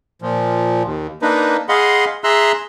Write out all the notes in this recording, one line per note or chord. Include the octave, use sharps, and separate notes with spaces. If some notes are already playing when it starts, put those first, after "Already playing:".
A#2 F3
D#2
A#3 D4 D#4 B4
G#4 D#5 F5 F#5 B5 C6
G#4 E5 A#5 C6 E6 F#6